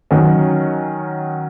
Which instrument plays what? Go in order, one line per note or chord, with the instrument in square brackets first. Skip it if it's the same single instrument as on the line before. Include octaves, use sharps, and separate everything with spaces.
[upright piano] D#3 F#3 C#4